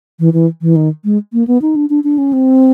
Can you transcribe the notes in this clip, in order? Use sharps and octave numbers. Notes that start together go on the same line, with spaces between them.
E3
E3
E3
D#3
G#3
A#3
B3
D#4
D4
D4
D4
C#4
C4